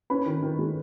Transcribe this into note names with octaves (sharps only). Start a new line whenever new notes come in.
C#4 B4 B5
D#3
D#3
G#3